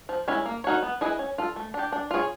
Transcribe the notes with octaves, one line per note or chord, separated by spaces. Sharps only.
F3
G#3 C#4 E4
A#3
D#4 F#4 A#4 C#5
B3
E4 G#4 B4 D#5
C#4
F4 A4
A3
D4 G4
D4
F4 G#4 C#5